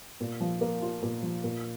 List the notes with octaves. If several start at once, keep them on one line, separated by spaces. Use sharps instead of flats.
A#2
F3
A#3
F4
A#2
F3
A#2